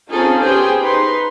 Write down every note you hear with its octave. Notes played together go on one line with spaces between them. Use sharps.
C4 C#4 D#4 F4 G#4 A4
B3 G4 G#4 C5 G5
D#4 B4 C6